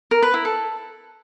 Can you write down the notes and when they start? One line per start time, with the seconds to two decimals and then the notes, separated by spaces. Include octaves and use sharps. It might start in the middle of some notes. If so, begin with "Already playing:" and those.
0.11 A#4
0.22 B4
0.34 E4
0.45 A4